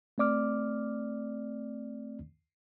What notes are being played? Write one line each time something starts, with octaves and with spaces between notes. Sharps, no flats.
A3 C4 D5 D6 F6